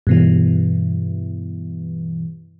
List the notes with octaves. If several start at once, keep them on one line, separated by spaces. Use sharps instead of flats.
G2 B2 E3